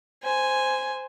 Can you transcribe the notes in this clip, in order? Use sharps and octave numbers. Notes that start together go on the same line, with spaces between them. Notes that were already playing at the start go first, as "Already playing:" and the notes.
C5 G#5